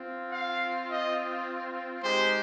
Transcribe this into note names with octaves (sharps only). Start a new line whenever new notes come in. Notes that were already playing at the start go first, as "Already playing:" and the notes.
Already playing: C4 F4
F5
D#5
G#3 D#4 G4 C5